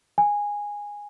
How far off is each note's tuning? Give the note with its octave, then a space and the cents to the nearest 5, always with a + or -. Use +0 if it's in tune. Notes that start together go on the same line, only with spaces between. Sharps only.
G#5 -10